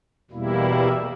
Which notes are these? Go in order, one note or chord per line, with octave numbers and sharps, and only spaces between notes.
E2 B2 G3 A#3 E4